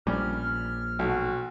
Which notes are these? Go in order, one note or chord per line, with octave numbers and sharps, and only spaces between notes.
A#1 G3 C#4 F6
B1 F#4